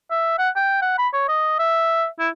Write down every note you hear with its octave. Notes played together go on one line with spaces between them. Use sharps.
E5
F#5
G5
F#5
B5
C#5
D#5
E5
E4